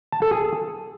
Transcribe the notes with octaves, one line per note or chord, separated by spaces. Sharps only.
A5
A4
G#4